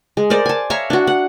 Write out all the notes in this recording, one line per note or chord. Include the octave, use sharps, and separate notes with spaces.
G#3
A#4 C5 D5
G#5 A5
C#5 E5 F5 A#5
D4 F#4
F#5